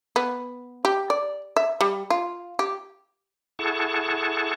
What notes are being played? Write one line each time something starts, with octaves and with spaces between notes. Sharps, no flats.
B3
G4
D5
E5
G3
F4
G4
E4 G#4 A4 F#5 A5 C#6